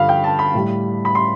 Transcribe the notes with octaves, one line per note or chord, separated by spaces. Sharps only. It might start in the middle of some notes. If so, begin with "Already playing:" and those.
Already playing: G2 D3 F3 F5 B5
G5
A5
B5
A2 G3
B5
C6